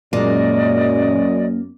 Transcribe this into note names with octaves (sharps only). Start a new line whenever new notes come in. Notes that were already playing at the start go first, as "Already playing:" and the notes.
F#2 A#2 G#3 A#3 D5 D#5